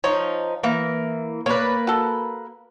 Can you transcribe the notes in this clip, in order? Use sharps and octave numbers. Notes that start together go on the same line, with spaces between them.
F3 D#4 C#5
E3 A#3
A#3 B4 C#5 D5
F#4 A4